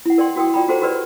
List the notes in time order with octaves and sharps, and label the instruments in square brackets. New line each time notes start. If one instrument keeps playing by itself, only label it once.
[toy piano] E4 F#5
A#4 D5 G5 C6
F#4 A#4 G5 D#6
F4 D5 G5 A#5 B5
F#4 G#4 A4 C5 F#5 A#5
F#4 G4 A#4 B4 D5